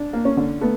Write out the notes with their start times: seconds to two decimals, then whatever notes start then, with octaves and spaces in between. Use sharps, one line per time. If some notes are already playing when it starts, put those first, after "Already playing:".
Already playing: D4
0.13 A#3
0.25 C#4
0.37 D3
0.61 A3 B3